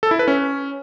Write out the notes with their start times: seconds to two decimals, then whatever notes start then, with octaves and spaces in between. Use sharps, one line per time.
0.03 A4
0.11 E4
0.19 B4
0.28 C#4